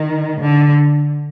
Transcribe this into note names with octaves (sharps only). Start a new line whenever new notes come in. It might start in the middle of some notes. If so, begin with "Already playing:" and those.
Already playing: D#3
D3